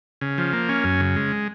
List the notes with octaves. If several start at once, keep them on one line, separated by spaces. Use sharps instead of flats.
C#3
F3
A#3
C#4
F#2
C#3
G#3